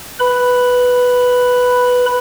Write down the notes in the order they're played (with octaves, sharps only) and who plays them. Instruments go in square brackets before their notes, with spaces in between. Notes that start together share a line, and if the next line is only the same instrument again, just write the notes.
[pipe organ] B4 B5